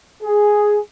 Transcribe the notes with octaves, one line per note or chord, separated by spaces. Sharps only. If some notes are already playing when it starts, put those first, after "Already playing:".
G#4